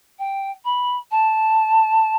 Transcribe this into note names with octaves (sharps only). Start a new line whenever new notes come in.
G5
B5
A5